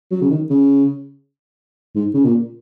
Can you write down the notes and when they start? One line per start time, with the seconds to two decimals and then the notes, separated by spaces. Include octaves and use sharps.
0.11 F#3
0.21 C#3
0.30 D#3
0.50 C#3
1.95 G#2
2.14 C#3
2.25 A#2